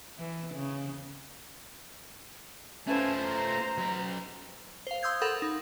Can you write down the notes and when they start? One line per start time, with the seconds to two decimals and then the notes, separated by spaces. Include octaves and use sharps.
0.18 E3
0.55 C#3
2.87 A3 C#4 E4 F4 B4 C5 G#5 A5
3.25 A#5
3.78 F#3 B5
4.87 C5 F5
5.03 C6 D#6 E6 G6 G#6
5.22 A4 A#4 F#5 B5 D#6
5.42 D#4